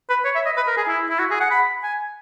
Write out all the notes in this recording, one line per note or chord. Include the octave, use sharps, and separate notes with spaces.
B4
C#5
E5
D#5
B4
A#4
G#4
E4
E4
F#4
G#4
F#5
B5
G#5